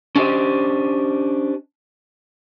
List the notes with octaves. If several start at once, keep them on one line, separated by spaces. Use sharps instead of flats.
C#4 D4 G4 G#4 C5 D#5